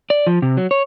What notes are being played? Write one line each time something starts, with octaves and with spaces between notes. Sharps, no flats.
D5
F3
C3
F#3
C#5